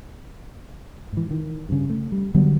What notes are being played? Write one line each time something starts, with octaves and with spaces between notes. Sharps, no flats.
G#2 E3
D#3
G2 C#3
A3
G3
D3 F#3 G3 B3